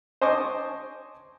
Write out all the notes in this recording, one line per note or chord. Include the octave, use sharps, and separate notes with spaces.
C5 D#5 G#5 A5 C#6 D6